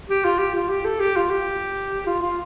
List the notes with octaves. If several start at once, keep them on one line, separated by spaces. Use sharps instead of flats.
G4
F4
G4
F4
G4
A4
G4
F4
G4
F4
F4